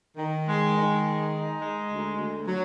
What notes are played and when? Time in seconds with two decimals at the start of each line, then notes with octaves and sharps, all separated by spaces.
0.17 D#3
0.46 G#3
0.75 D#3
1.03 G#3
1.32 D#4
1.61 G#3
1.89 D2
2.18 D2
2.47 F#3